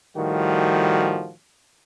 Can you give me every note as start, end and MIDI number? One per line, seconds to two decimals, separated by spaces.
0.16 1.33 45
0.16 1.33 51
0.16 1.33 53
0.16 1.33 55
0.16 1.33 66